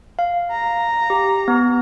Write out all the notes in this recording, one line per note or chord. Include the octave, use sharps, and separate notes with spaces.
F5
A#5
G4
B3